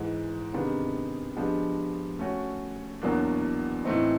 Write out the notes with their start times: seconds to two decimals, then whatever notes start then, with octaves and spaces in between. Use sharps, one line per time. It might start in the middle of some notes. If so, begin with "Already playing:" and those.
Already playing: G#2 E3 G#3
0.53 C3 D#3 G#3 B3 D4
1.37 F3 G#3 B3 D4 G4
2.19 A3 C#4 F#4
3.02 E2 B2 F#3 A#3 D4
3.85 A2 E3 A3 C4 D#4